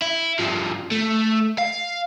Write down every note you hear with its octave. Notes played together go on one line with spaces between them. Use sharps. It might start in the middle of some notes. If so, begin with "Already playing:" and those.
E4
G2 F3
A3
F5